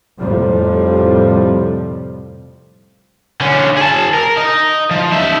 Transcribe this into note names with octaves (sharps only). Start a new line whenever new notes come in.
F2 A2 C3 F3 G3
D3 C#4
G#4 A5
A#4
D#4
F3
D#4 E5